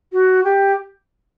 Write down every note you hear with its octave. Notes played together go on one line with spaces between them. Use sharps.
F#4
G4